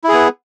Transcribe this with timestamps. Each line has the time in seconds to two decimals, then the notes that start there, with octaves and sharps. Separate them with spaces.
0.04 E4
0.09 G#4
0.13 B3